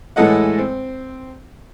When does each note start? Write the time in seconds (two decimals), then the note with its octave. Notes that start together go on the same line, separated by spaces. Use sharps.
0.16 A2 E3 G#3 A4 D#5 F#5
0.58 C4